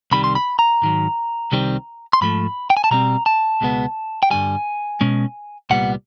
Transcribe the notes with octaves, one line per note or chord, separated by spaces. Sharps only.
C2 C3 D#3 G3 B5
C6
B5
A#5
G#2 D#3 F#3
C2 C3 D#3 G3 C4
C6
G#2 F3 A3 B5
G5
G#5
A5
B2 G3 C4 A#5
A5
C#2 B2 G#3 B3
G5
G2 D3 G3 G#5
B2 G#3 C#4
C2 A#2 G3 B3 F#5